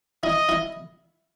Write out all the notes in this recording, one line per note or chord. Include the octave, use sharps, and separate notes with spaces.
E4 D#5
E4